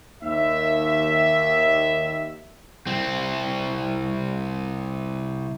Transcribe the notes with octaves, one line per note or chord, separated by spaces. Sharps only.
D#2 E5
C2 C4